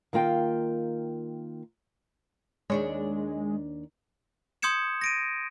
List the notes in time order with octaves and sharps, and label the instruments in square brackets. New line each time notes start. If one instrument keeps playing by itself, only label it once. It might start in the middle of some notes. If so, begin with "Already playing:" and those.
[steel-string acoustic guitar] D#3 A#3 F4 G5
[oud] D#2 D4 C#5 [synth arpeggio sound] G#3
[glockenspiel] C6 D#6 G6 G#6 C#7 E7
A#6 D7 D#7